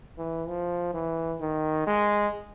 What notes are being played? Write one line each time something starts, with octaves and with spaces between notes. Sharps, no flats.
E3
F3
E3
D#3
G#3